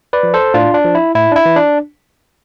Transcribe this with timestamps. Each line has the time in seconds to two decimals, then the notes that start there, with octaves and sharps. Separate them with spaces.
0.13 B4 D5
0.23 F3
0.34 A4 C5
0.54 A2 D4 F4
0.74 D4
0.85 F3
0.95 E4
1.15 A2 E4
1.32 D4
1.36 E4
1.46 E3
1.56 D4